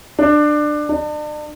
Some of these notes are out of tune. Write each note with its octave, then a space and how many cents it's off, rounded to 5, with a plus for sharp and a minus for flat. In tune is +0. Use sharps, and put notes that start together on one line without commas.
D4 +20
D4 +40